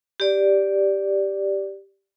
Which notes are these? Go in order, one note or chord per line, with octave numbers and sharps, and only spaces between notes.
G4 D5